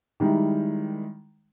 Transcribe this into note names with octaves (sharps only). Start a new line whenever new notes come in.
D#3 G3 G#3 D#4 E4